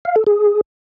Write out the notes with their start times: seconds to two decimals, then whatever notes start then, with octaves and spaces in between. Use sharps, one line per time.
0.05 F5
0.16 A4
0.27 G#4